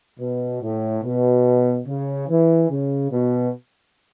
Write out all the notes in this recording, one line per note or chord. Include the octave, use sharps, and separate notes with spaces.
B2
A2
B2
C#3
E3
C#3
B2